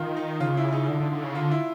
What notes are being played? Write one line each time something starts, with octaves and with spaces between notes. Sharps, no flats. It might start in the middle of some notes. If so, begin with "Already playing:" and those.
Already playing: D#3 F4
D#4
C#3 F4
E4
D#4
D3
D3
D3
C#3
D3 F4
E4